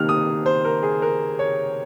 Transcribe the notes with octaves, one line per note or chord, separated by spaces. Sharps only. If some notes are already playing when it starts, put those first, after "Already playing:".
Already playing: C3 D#3 A#3 D#4 F6
D#6
C5
A#4
G#4
A#4
C#5